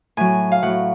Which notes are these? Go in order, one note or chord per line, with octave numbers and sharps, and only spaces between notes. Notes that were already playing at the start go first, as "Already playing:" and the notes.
A2 F#3 G#5
F5
A2 F#3 F#5